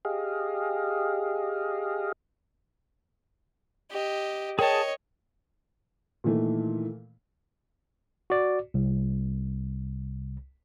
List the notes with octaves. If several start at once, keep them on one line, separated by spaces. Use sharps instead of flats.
G4 G#4 D#5 F5
G4 D#5
G#4 A#4 C#5 D#5 G5 A5
A#2 D#3 E3 A3
F#4 D5
C2